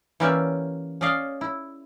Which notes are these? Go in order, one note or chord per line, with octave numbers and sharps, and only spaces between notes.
E3 A#3 C#4 G4 D5 E5
C#4 G#4 D5 D#5 F5
E4